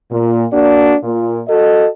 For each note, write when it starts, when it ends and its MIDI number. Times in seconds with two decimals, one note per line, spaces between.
0.11 0.44 46
0.52 0.95 58
0.52 0.95 62
0.52 0.95 66
0.52 0.95 74
1.03 1.41 46
1.48 1.88 66
1.48 1.88 69
1.48 1.88 75